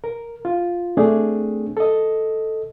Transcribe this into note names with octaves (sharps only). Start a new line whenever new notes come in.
A#4
F4
A3 C4 D4 G#4
A4 D#5